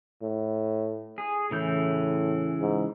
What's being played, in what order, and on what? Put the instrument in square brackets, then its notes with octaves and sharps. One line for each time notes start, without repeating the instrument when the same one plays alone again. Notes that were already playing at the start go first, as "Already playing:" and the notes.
[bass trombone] A2
[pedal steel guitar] G#4
[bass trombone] A2 [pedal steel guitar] C#3 E3 G6
[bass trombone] G#2